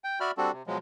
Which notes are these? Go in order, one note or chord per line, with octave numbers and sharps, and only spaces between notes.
G5
F#4 D5 E5 B5 F6
G3 C4 D4 F#4 A4
C3
B2 F3 F#3 G#3